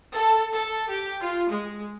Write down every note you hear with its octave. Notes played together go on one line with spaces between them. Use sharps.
A4
A4
G4
F4
G#3